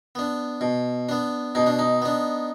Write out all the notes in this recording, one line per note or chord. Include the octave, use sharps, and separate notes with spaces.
B3 D4
B2
B3 D4
B2 D#4
D4
D#4
B3 D4